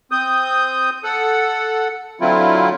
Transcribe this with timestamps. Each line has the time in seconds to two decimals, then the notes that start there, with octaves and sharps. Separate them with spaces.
0.11 C4 D#6 G6
1.04 A4 F#5
2.21 D3 F#3 A3 C4 E4 F4